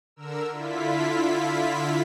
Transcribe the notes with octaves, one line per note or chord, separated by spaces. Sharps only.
D3 A#4 E6
D3 E4 F4 B6